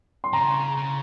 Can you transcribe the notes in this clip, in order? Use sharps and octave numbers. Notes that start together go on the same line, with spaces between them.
C6
C#3 A#5
C#3